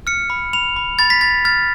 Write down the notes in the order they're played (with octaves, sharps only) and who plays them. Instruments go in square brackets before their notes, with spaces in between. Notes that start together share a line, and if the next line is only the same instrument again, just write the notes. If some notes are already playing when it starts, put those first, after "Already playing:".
[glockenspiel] F6 C#7
B5
B5 F7
B5
B5 A6
B6
B5 A6
F6 A6